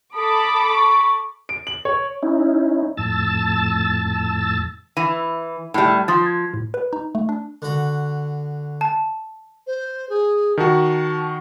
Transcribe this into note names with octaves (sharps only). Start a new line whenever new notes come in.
A4 B5 D6 D#6
C#6
D7
F#7
C#5
C#4 D#4 E4
F2 A2 A5 E6 A6
E3 D#7
A2 G3
F3 C6 D#6 A6
G#6
A2
B4
D#4
A3
D4
D3 F#4
A5
C5
G#4
D#3 F#4 A5